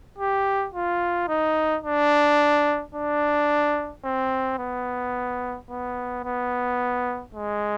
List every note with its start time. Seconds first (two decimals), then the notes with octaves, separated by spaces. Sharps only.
0.18 G4
0.74 F4
1.28 D#4
1.84 D4
2.95 D4
4.05 C4
4.59 B3
5.70 B3
6.24 B3
7.35 G#3